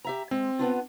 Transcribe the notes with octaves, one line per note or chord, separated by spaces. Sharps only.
G4 E5 A#5
G#3 C4
B3 D4 F4